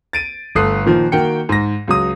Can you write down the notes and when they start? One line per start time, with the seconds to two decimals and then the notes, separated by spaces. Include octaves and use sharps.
0.13 A6 D7 D#7
0.55 G1 A3 A4 D#6 F#6 C7
0.86 A#2 D#3 F3
1.12 D#3 A#3 F#4 G5 C#7
1.49 G#2 A#6
1.88 C#2 F#3 D#6